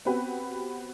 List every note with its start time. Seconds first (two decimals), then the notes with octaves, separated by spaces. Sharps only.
0.05 B3 C4 F#4 G4 B4